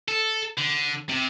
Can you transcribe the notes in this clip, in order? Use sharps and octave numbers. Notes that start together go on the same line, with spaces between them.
A4
D3
C3